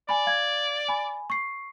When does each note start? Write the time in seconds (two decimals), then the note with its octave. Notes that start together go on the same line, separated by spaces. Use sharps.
0.09 D5 G#5 B5
0.27 F5 G#6
0.88 G#5 B5
1.30 C#6 C7